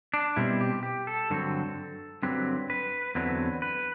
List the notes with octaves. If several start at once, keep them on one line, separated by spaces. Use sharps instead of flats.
D4
B2 G3 C4 E4
G4
G4
A4
G2 D3 F#3 C4
G2 D3 F#3 C4 B4
B4
E2 D3 F#3 C4 B4
B4